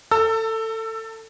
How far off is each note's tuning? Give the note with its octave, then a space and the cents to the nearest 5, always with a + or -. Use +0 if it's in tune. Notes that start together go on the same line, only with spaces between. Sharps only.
A4 +20 A5 +45 E6 +10